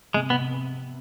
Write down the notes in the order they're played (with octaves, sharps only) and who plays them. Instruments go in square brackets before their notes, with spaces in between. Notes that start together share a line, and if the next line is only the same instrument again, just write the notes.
[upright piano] C3 [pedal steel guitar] G#3
[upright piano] C3 [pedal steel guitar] B3